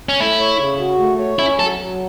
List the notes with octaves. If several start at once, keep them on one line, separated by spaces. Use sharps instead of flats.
C#4
A3 E4
C#5
C#3
F#4
A3
C#5
C#4 E4
F#3 A4
F#3